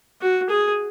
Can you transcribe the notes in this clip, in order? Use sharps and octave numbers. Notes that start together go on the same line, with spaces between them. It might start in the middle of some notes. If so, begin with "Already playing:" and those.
F#4
G#4